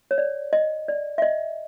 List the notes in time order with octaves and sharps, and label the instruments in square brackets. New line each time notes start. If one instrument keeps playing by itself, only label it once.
[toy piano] C#5
D5
D#5
D5
E5
D#5